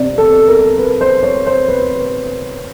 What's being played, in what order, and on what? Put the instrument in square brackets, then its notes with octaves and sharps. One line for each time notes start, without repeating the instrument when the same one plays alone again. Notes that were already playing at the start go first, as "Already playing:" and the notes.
Already playing: [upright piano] C3 [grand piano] D5
[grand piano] A4
A#4
B4
C5
C#5
C5
B4